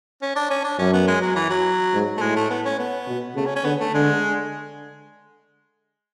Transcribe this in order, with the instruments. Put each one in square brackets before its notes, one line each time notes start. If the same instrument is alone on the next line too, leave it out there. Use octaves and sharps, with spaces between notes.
[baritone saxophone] C#4
D4
C#4
D4
[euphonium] F#2 [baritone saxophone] C#4
[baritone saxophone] B3
G#3
F#3
E3
F#3
[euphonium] G#2
[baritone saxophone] A3
[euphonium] A2 [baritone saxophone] G#3
[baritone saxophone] A3
B3
C#4
B3
[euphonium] B2
[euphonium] C#3 [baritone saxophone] A3
[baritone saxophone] C#4
C#4
[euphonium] D3 [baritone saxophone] B3
[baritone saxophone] A3
[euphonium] D3 [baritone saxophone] G#3